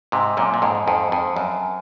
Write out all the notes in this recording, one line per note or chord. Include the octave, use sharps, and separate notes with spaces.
G#2 C3
F#2 A#2
A#2
F2 G#2
F2 G#2
F2
F#2